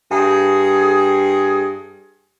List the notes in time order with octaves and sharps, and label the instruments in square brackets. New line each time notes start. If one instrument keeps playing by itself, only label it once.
[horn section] G2 G#4